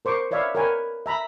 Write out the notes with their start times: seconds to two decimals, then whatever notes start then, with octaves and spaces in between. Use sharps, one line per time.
0.05 A#4 C5 C#6 D6
0.31 B4 C#5 D5 E5 F5
0.55 A#4 B4 C#5 G5 G#5
1.06 E5 A#5 B5